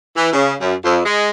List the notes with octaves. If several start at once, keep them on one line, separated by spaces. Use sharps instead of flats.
E3
C#3
F#2
F2
G#3